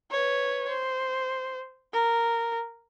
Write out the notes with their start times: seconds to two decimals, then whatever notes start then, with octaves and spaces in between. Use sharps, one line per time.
0.11 B4 C#5
0.69 C5
1.93 A#4